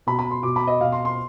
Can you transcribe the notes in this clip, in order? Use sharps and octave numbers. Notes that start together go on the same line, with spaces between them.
B2 B5
B5
C6
B2 D6
B5
D#5
B2 F5
C6
C6